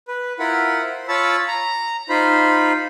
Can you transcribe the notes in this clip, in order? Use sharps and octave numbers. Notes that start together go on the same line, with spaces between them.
B4
E4 F4 A#4 F#5 B5
C5
F4 C#5 A5 B5 E6
A#5
D#4 F4 C5 B5